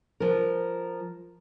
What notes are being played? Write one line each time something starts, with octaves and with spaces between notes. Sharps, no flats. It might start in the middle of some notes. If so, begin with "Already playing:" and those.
F3 A#4